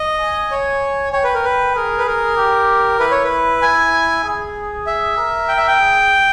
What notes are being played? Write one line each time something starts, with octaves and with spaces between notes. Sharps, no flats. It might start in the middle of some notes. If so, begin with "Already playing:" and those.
Already playing: D#5
G#5
C#5
C#5 G5
B4
A#4
B4
G#4 A#4
B4
A#4
G4
E4 B4
C#5
B4
E4 G#5
G#4
E5
A#4
G5
E5
G5
G#4